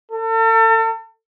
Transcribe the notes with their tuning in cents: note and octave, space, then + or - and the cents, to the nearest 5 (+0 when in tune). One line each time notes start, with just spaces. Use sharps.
A4 +40